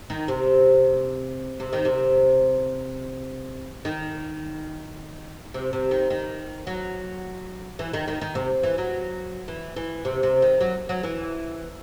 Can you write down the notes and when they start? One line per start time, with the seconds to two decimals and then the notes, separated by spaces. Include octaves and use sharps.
0.10 D#3
0.28 C3
1.60 C3
1.73 D#3
1.85 C3
3.85 D#3
5.54 C3
5.73 C3
5.91 D#3
6.10 D#3
6.67 F#3
7.79 E3
7.94 D#3
8.08 D#3
8.21 D#3
8.35 C3
8.63 E3
8.78 F#3
9.48 E3
9.76 E3
10.05 C3
10.23 C3
10.42 D#3
10.61 F#3
10.89 F#3
11.03 E3